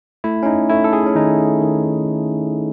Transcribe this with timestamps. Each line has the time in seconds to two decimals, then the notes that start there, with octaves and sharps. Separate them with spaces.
0.24 A3 E4
0.43 C#4
0.46 D#4
0.69 A3 E4
0.84 A4
0.93 G#4
1.06 C#4
1.15 D#3 D#4
1.61 D#3